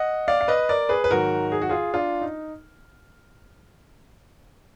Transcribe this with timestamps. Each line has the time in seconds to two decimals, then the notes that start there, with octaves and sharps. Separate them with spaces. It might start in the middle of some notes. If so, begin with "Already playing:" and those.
Already playing: D#5 F#5
0.28 D5 F5
0.41 F5
0.48 B4 D#5
0.69 A#4 D5
0.89 G#4 B4
1.04 B4
1.10 G#2 D#3 F#3 F#4 A#4
1.52 G#4
1.61 F#4
1.69 F4 G#4
1.94 D4 F4
2.21 D#4